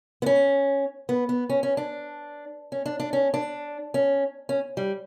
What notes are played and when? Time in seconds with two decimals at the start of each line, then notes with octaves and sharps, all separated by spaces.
0.22 B3
0.26 C#4
1.09 B3
1.29 B3
1.50 C#4
1.63 C#4
1.77 D4
2.72 C#4
2.86 D4
3.00 D4
3.13 C#4
3.34 D4
3.94 C#4
4.49 C#4
4.77 G3